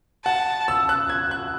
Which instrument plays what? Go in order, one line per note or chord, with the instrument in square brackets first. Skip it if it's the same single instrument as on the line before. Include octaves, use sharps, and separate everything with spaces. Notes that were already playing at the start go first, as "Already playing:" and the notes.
[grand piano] F#5 [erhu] A5
[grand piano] E6
F#6
G#6
F#6